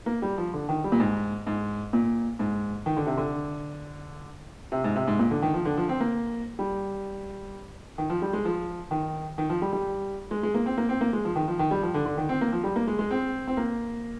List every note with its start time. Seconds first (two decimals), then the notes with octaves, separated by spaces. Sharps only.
0.06 A#3
0.22 G3
0.38 F3
0.53 D3
0.69 D#3
0.84 G3
0.92 A#2
1.00 G#2
1.47 G#2
1.93 A#2
2.39 G#2
2.86 D#3
2.96 D3
3.06 C3
3.17 D3
4.72 C3
4.84 G#2
4.96 C3
5.07 G#2
5.19 A#2
5.31 D3
5.42 D#3
5.54 F3
5.65 D3
5.77 F3
5.89 C4
6.00 A#3
6.59 G3
7.98 D#3
8.10 F3
8.22 G3
8.33 G#3
8.45 F3
8.91 D#3
9.38 D#3
9.50 F3
9.62 G3
9.73 G3
10.31 G#3
10.43 G#3
10.54 A#3
10.66 C4
10.77 A#3
10.89 C4
11.01 A#3
11.13 G#3
11.25 F3
11.36 D#3
11.48 F3
11.59 D#3
11.71 G3
11.83 F3
11.94 D3
12.06 D3
12.17 D#3
12.29 C4
12.41 A#3
12.52 F3
12.64 G3
12.76 A#3
12.87 G#3
12.99 G#3
13.11 C4
13.47 C4
13.57 A#3